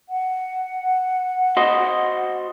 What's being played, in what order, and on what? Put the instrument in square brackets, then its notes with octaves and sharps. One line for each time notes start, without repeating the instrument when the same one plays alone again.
[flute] F#5
[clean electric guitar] F#4 C5 D#5